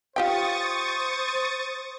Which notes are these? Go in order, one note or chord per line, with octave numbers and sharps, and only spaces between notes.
F4 G4 C5 G5 C#6 D#6 A6